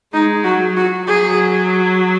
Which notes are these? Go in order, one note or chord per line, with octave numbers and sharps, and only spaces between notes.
G#3 D#4
F#3 F#4
F#4
F#3 G#4